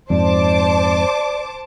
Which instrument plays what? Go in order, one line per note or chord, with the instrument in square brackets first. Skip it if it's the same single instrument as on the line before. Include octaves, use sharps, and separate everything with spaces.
[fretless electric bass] F2 G#2 [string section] C5 A5 D6 [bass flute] D5